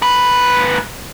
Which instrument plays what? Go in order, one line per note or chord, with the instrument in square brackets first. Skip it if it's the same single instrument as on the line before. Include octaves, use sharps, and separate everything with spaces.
[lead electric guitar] G#2 B4